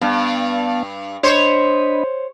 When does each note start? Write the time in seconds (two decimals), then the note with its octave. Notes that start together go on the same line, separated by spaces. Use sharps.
0.02 G2 B3 F5 A5
1.23 D4 C5 C#5 D#5 B5